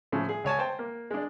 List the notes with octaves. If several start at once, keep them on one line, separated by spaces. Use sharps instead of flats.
A2 C#3 F3
G#4
C#2 C#5 G#5 A5
C5 G5 A5
A#3
G#3 D4